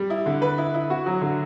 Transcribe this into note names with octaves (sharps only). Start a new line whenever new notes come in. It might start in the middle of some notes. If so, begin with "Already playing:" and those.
Already playing: G3
E4
D3
B4
E4
E4
F#4
F#3
D3